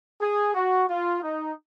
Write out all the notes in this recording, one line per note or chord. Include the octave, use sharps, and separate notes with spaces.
G#4
F#4
F4
D#4